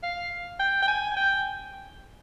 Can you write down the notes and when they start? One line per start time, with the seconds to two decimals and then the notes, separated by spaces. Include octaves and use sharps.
0.03 F5
0.59 G5
0.82 G5
0.88 G#5
1.16 G5